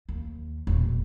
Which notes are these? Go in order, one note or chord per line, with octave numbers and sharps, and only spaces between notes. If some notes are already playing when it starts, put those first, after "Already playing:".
D#2
E1 A#2